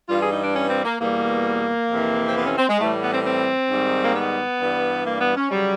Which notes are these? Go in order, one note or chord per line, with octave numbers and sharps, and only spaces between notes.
G2 E3 G3 F4
G#4
D#4
D4
C#4
C4
A#3
E2 B2 G3 A#3
F2 C3 E3
C4
B3
C#4
C4
G#3
A2 E3 G3 A3
B3
C4
C4
G#2 D#3 G3
A#3
B3
G2 E3 G3
A#3
B3
C#4
C#3 F#3 G3